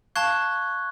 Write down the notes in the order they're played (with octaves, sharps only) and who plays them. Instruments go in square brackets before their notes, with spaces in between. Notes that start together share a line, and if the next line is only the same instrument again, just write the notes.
[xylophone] F5 A5 [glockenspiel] C#6 F#6 G#6